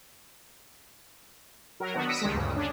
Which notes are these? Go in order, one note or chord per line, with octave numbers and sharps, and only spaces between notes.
F#3 A#4
D#3 B3 D4 F#4
D#6 E6 A#6 B6 C#7 D7
C#2 D#3 G3 G#3
D2 G2 C#3
C#4 D4